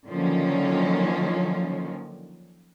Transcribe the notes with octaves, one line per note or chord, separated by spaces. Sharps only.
D3 D#3 F3 F#3 A#3 C#4